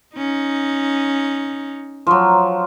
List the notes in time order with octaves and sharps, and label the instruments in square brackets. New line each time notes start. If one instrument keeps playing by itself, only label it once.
[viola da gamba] C#4 D#4
[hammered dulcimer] F3 F#3